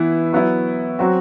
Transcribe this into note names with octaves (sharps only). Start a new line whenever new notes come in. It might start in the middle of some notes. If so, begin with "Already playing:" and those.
Already playing: E3 B3 E4
F#3 B3 E4
F#3 C4 F#4